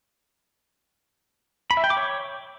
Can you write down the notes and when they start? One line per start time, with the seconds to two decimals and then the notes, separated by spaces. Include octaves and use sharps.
1.71 B5
1.77 E5
1.84 G5
1.90 D6
1.97 C#5